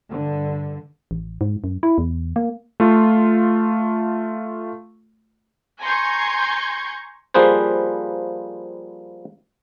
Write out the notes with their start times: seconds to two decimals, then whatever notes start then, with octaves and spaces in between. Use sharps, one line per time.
0.11 G2 D3
1.11 A1
1.41 G#2
1.64 F#2
1.83 E4
1.98 E2
2.36 A#3
2.80 A3 F4
5.82 G#5 A#5 C6 C#6 G6 G#6
7.34 F3 G3 A#3 G#4 B4 C5